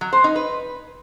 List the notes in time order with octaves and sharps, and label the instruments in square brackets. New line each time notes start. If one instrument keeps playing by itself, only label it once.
[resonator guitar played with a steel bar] F#3
C5
D#4
B4